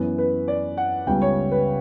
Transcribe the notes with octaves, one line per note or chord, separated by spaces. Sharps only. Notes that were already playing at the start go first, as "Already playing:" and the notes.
Already playing: F#2 E3 B3
B4
D5
F#5
C#2 C#3 G3 B3 G5
C#5
B4